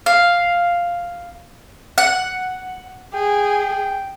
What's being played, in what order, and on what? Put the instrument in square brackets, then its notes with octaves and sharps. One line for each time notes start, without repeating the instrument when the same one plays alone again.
[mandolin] F5
F#5
[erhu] G#4 [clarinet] G5